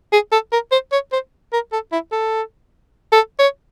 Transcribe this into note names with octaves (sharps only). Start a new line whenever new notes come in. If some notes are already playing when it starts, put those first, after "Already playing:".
G#4
A4
A#4
C5
C#5
C5
A#4
A4
E4
A4
A4
C#5